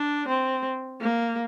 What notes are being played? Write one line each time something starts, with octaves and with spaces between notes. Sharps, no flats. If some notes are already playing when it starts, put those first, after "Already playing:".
Already playing: D4
C4
A#3